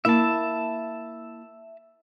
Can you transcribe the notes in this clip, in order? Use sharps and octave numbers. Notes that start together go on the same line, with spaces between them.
A#3 E4 E5 A5